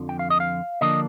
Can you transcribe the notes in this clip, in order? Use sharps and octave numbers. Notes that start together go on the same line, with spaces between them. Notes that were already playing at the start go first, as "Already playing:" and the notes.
Already playing: F2 D3 F3
G5
F5
D#5
F5
D3 F3 A#3 D4 D#5